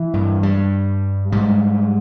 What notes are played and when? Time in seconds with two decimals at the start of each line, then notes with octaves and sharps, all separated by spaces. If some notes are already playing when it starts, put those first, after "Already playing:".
Already playing: E3
0.14 G2
0.43 G3
1.32 G#2 G3